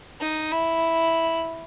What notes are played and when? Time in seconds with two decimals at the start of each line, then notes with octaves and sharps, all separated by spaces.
0.21 D#4
0.52 E4